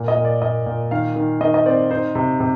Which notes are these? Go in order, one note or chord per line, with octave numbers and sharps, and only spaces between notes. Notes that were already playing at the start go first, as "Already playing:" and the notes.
Already playing: A#2
D#5
A#2
D5
A#2 D#5
A#2
D#3 F5
D#3
D#3 D#5
D#5
C4 D5
D#4 C5
C3
C3